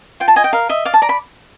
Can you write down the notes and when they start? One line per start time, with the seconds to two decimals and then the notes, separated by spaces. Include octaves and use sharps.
0.20 F4 G5
0.28 A5
0.36 D#5 G#5
0.44 G5
0.53 A#4 F5
0.69 D#5 E5
0.85 D5 F5
0.94 A5
1.02 D5 A#5
1.09 B5